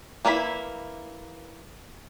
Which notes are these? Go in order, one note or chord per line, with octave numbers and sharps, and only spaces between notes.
E3 A#3 D4 E4 B5